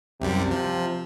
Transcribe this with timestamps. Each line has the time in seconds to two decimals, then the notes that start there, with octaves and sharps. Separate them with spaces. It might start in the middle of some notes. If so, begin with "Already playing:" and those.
0.21 C2 F#2 C3 G3
0.51 F3